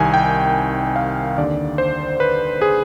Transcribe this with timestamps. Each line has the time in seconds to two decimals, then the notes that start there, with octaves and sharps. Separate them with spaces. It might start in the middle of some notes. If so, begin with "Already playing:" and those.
Already playing: C2 C3 D#3 G#5
0.14 G5
0.96 F5
1.37 D#2 D3 D5
1.78 C5
2.20 B4
2.62 G#4